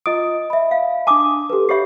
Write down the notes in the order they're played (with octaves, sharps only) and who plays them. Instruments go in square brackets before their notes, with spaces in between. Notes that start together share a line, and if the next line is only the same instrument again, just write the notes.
[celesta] F4 D7 [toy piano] D#5 D#6
[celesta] E5 B5
[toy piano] F5
[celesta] D4 G#5 [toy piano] A5 D6 D#6
[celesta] G4 A4 B4
[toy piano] G4 C#5 E5 [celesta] B5 C7